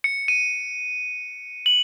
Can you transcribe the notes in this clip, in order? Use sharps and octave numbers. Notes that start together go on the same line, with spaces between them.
C#7
D#7
F#7